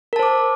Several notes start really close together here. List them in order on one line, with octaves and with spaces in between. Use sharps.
A#4 A5 C5 D6